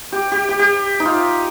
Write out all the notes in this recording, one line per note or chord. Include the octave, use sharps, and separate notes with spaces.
G4
G4
G4
G4
D#4
F4